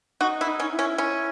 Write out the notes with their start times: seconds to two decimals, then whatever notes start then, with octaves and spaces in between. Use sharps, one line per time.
0.21 D#4 F#4
0.41 E4
0.47 D#4
0.60 C#4
0.63 D#4
0.73 E4
0.79 C#4
0.98 C#4 E4